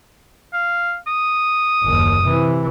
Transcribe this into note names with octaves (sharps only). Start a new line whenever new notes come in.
F5
D#6
F#1 D#2
C3 E3